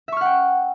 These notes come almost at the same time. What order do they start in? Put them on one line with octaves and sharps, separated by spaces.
E5 C#6 F6 F#5 G5